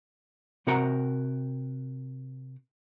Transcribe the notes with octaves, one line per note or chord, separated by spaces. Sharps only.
C3 C4 F#4 A#4 F#5 A#5